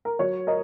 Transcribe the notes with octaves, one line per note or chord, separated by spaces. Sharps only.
A#4
F#3 C#5
A#4 D#5